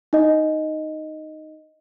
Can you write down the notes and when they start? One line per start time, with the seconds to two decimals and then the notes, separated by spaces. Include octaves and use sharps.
0.13 D#4 D#5